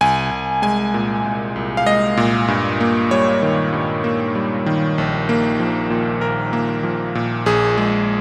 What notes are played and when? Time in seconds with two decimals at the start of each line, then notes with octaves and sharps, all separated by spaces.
0.01 C2 G#5
0.31 C2
0.62 G#3 G#5
0.94 A#2
1.25 C2
1.56 C2
1.77 F5
1.86 G#3 D#5
2.17 A#2
2.48 G2
2.81 A#3
3.11 G3 C#5
3.42 D#3
3.73 G2
4.04 A#3
4.35 G3
4.66 D#3
4.98 A#1
5.29 A#3
5.60 F3
5.90 A#2
6.21 A#1 A#4
6.53 A#3
6.83 F3
7.15 A#2
7.46 A#1 G#4
7.77 G#3